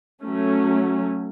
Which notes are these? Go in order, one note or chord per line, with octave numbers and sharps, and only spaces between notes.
F#3 A3 C#4